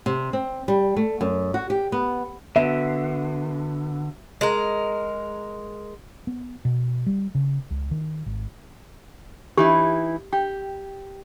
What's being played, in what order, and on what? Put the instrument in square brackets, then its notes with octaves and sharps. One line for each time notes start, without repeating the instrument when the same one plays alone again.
[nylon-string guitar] C3
C4
G3
A3
F#2
F#4
G4
B3
[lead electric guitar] D3 [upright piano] B3 F#4 [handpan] E5
[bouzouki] G#3 A#4
[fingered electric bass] B3
B2
G3
C#3
C#2
D#3
G#1
[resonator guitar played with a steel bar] E3 D#4 E4 [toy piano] G4
[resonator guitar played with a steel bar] G4 [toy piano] G5